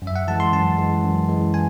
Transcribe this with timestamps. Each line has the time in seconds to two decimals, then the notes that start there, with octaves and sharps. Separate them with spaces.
0.02 F#2
0.07 E5
0.16 F#5
0.27 E3 G#3 A5
0.40 C6
0.52 F#2 A5
0.77 E3 G#3
1.04 F#2
1.29 E3 G#3
1.54 G#5